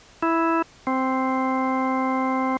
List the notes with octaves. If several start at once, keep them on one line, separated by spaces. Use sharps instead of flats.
E4
C4